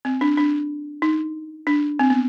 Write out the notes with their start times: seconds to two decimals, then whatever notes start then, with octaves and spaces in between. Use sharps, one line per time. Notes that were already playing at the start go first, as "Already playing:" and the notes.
0.05 C4
0.21 D4
0.37 D4
1.02 D#4
1.67 D4
1.99 C4
2.10 B3